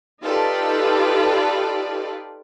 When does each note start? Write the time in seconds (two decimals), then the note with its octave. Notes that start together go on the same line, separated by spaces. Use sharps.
0.23 D#4 F4 G4 A4 B4 D5